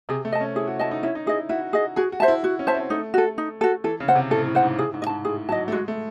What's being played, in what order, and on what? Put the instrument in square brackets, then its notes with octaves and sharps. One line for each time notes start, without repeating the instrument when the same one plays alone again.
[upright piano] C3 [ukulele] G#4
[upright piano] A3
[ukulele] D#5 A5
[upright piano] C#4
[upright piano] E4 [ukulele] G#4
[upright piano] F#4
[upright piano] E4 [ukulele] D#5 A5
[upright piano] D#4
[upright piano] C#4 [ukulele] E4
[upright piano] D#4
[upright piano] E4 [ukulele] G#4 D#5
[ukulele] E4 [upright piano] F#4
[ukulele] G#4 D#5
[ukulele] F#4 [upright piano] G#4
[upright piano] F#4
[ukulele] C5 E5 A5
[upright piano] E4
[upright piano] E4 [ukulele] F#4
[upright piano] C#4
[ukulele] C5 E5 A5
[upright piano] C4
[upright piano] A3 [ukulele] D#4
[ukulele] F#4 A4
D#4
F#4 A4
[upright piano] E3 [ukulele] A4
[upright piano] C#3
[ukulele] C5 F#5
[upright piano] C3
[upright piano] A2 [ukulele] A4
[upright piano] A2
[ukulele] C5 F#5
[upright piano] G#2
[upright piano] A2 [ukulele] G#4
[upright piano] G#2
[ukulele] D#5
[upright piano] G#2 [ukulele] A5
[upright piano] A2 [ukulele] G#4
[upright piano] F#3 [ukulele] A5
[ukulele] D#5
[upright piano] A3
[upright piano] G#3 [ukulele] F#4
[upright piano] A3